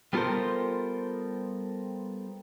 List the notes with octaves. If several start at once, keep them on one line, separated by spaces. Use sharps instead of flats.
G3 B3 F4 A4 A#4 C5